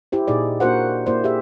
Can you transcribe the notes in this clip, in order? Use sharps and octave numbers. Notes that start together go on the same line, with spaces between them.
E4 G4 C5
A#2 D#4 G#4 D5
A#3 D4 F#4 A#4 C5 F#5
A#3 E4 C5 D5
G4 G#4 E5